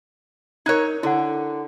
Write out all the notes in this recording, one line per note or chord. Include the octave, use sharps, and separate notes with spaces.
D#4 A#4 C#5 F#6 G#6
D3 E4 A4 F#5